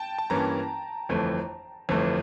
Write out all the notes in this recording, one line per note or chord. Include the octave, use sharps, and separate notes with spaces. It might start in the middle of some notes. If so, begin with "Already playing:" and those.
Already playing: G5 A5
A5
G2 E3 A#3 C#4 A#5
G1 F2 E3 A3
G1 F2 E3 A3